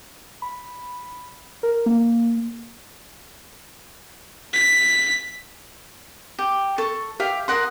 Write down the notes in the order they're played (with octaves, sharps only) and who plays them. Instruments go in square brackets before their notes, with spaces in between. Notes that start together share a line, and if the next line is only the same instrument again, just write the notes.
[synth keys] B5
A#4
A#3
[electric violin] B6
[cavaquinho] G4
A4 C#6
[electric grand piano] G4 [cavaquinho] E5 F5 G5
[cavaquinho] A#4 F#5 D#6 [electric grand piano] C6